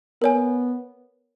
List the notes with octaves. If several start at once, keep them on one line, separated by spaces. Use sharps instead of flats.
B3 A#4 C#5 G#5